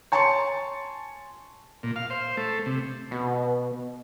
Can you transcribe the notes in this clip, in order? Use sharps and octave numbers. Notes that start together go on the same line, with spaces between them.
C#5 G#5 A5 C6 C#6 C#7
A#2
F5
C5
A3
C3
B2